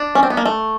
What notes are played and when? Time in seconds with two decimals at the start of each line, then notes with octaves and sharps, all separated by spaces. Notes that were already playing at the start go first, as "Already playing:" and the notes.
Already playing: D4
0.15 C#4
0.23 C4
0.30 B3
0.37 A#3
0.46 A3